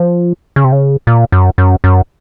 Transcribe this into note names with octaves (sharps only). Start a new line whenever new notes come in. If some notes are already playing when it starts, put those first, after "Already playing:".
Already playing: F3
C#3
C3
C#3
A#2
F#2
F#2
F#2